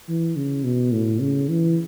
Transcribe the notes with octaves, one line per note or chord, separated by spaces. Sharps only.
E3
C#3
B2
A2
C#3
E3